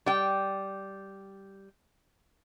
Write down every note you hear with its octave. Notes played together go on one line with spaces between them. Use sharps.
G3 G5